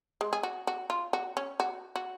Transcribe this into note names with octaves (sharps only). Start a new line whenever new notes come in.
G#3
G#4
F#4
F#4
F4
F#4
C#4
F#4
F#4